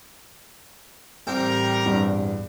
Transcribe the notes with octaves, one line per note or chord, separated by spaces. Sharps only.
A1 G3 C4 G4 A#4 G5
E2 G2